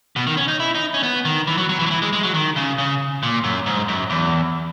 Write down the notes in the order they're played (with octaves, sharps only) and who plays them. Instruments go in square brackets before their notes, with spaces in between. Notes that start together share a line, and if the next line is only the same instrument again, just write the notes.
[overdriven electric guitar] B2
D#3
C#4
D#4
E4
D#4
C#4
B3
D#3
E3
F#3
F#3
E3
F#3
E3
G#3
G#3
F#3
D#3
C#3
C#3
A#2
F#2
G#2
F#2
E2